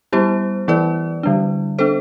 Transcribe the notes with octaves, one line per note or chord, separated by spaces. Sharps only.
G3 B3 E4 G4 C5
E3 B3 E4 B4 D5
D3 G3 D4
B3 D4 A4 C5